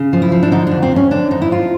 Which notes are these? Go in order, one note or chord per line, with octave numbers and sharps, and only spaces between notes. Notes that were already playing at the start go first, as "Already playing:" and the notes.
Already playing: C#3
F3
E4
F3
D4
D3 D#4
F2 D4
C4
F2 C#4
D3 D4
F2 D#4
E4
F2 F4